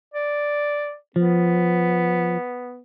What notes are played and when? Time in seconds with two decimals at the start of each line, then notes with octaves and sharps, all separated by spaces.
0.14 D5
1.16 F3 B3